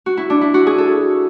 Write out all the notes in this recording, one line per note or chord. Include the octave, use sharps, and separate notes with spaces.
F#4
E4
D4
E4
F#4
G#4
A4